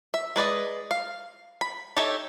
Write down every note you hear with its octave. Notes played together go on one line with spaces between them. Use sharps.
E5
G#3 B4 D5 D#5
F5
B5
D#4 G4 A4 C#5 E5